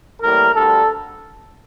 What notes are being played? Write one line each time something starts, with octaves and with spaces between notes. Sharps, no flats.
A2 E3 G3 A#3 A#4
D2 D3 G3 A4